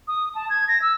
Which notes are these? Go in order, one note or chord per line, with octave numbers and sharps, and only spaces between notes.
D#6
A5
G#6
A#6
E6